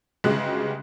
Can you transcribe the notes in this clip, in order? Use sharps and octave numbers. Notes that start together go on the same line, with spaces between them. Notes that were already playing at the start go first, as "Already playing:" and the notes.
G1 C#3 G#3 F#4 G4 F#6